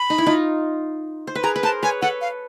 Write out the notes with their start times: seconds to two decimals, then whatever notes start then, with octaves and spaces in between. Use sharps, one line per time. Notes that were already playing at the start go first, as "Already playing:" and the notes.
Already playing: B5
0.10 D#4
0.18 E4
0.26 D#4 F4
1.27 C5
1.35 B4
1.43 G#4 A#4 A#5
1.56 B4
1.63 A#4 C5 A5
1.83 B4 C#5 G#5
2.02 A4 B4 F#5
2.21 F5